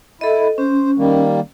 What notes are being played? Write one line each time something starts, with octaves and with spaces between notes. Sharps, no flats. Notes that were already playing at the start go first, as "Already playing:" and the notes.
E4 A4 D#5
C#4 C5
D#3 G3 A#3